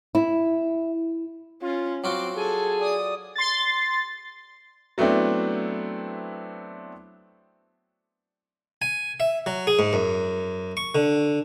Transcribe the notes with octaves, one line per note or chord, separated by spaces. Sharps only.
E4
C#4 F4
F#3 C4 F4 F#4 D6
G#4 A4 G#5
D5 D#6
C6 A6
F#3 A3 B3 C4 D4 E4
G#5
E5
F#3
G#4
G#2
F#2
C#6
D3